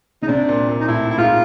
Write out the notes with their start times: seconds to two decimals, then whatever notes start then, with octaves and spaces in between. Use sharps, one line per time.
0.22 C#3 D#4
0.28 C3 D4
0.48 A#2
0.68 A#2
0.80 D#4
0.88 A2 E4
1.11 E4
1.18 G#2 F4